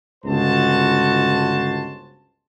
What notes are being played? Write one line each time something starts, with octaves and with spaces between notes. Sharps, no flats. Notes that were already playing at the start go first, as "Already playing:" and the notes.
G1 C#2 G#3 F#4 C5 A5